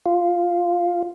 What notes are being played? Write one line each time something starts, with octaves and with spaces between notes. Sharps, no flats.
F4